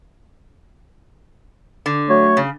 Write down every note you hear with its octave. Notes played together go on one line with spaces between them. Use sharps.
D3
F#3 A3 C#5
C#3